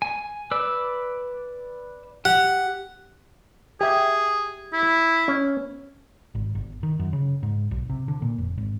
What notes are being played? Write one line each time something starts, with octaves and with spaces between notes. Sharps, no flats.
G#5
B4 D5 E6
G4 F#5
G4 G#4 E5
E4
C#4
G#1
G1
D#3
F#2
C#3
G#2
B1
C3
D3
A#2
F1
G#1